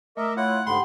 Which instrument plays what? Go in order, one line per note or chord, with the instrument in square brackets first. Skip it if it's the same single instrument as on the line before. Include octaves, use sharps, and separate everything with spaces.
[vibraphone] A3 [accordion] A#4 D#5 E5 [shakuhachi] D6
[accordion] E4 F4 [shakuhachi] C#5 [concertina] F#5
[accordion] G#2 D3 G#3 [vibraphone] G4 F#5 G5 [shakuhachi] B5 [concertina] C6